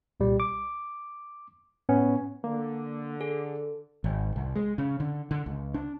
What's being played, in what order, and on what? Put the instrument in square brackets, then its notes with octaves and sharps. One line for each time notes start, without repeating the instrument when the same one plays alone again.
[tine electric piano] C2 A#2 G3
D6
A2 B3 C#4
[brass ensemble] D3 [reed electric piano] A#3
[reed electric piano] G#4 [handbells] A4
[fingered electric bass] G#1
C2
G#3
C#3
D3
D3
C#2
D4